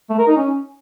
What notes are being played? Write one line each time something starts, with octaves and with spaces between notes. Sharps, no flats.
A3
A#4
D#4
C#4